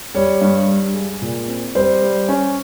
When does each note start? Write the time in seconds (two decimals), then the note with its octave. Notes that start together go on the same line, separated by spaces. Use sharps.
0.15 G3 C#5
0.41 G2
0.68 G3
0.94 G#3
1.22 A#2
1.48 C4
1.75 G3 C5
2.02 G3
2.29 C#4